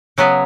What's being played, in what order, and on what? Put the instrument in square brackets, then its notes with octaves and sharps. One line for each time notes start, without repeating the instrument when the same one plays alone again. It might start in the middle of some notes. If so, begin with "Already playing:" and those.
[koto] C#3 F#3 B3